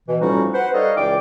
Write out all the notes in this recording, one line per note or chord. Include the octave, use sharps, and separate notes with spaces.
B2 E3
A2 F3 G3 C#4 D#4 F#4
B4 C5 F#5
G3 D#4 A4 C#5 D#5 F5
C#2 E3 D5 G5 D6